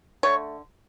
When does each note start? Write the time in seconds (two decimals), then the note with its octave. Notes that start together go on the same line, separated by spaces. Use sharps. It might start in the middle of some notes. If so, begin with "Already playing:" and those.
0.23 D3 A3 C#5